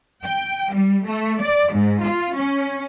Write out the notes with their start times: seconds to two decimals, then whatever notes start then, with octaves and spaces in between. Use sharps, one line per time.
0.24 G5
0.73 G3
1.06 A3
1.40 D5
1.72 G#2
2.03 F4
2.35 C#4